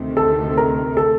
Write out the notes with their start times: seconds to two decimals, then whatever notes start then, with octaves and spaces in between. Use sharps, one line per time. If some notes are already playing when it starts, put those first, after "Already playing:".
Already playing: D2 C3 D#3 A3
0.17 A4
0.57 A#4
0.97 A4